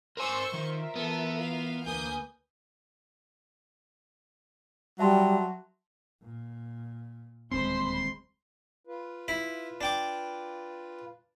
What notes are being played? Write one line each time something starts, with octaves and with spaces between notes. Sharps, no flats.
A#4 C5 G#5 C6 C#6 E6
D#3 F4 A#4 E5
E3 B3 A4
F5
D2 A#3 B4 G#5 D#6 G6
F#3 G3 E5 A5 C6
A#2
D#1 D2 G#3 C4 C5 B5 C6
F4 B4
E4 B5
D4 G5 D6